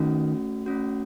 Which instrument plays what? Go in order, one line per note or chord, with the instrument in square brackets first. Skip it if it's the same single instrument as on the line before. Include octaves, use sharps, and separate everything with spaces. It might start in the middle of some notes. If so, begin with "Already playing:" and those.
Already playing: [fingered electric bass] D#3 [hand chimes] A3 C#4 F#4
[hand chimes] A3 C#4 F#4